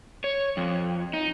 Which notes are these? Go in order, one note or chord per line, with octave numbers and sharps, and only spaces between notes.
C#5
F2
D#4